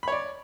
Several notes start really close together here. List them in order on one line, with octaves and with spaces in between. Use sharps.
B5 C#5 D5